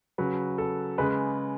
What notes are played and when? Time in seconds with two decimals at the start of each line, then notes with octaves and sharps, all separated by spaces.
0.18 C#3 F#3 B4
0.58 A4
0.98 C#3 G#3 B4